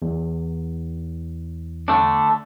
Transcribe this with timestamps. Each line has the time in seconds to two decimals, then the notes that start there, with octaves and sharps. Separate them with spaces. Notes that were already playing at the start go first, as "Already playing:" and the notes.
0.02 E2
1.88 D3 A3 D4